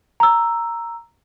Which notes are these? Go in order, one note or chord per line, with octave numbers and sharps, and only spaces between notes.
A#5 E6